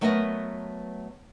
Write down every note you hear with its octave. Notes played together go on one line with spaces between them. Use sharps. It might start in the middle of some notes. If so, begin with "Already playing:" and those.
F#3 A3 B3 A#4 B4 D#5